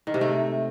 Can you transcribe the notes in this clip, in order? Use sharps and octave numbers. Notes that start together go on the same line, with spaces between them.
D#3
C3
A3